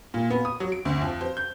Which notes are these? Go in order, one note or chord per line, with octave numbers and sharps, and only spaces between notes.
A#2
B3
D#6
F#3
D7
D2
F2
C5
G6